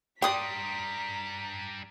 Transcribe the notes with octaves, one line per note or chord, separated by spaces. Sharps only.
G3 D4 D5 G5 A#5 C6 D#6 B6